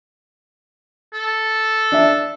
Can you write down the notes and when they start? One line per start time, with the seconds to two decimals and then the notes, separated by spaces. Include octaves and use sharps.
1.14 A4
1.92 D4 E5